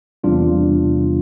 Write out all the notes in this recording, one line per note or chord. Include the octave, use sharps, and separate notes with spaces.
E2 C3 G3 D4 F4